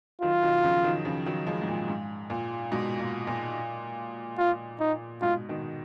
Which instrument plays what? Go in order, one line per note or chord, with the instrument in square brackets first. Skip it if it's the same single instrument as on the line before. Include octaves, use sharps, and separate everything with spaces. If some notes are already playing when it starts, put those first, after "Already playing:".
[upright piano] D#3 F#3 [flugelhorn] F4
[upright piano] B2 D#3
C#3 F3
D#3 F#3
C#3 F3
D#3 F#3
F3 G#3
G#2
A#2
G#2
A#2
G#2 B2
A#2
A#2
[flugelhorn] F4
D#4
[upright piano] G#2 B2 [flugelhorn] F4
[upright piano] B2 D#3